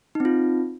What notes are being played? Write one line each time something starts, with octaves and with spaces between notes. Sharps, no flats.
C4 D#4 F4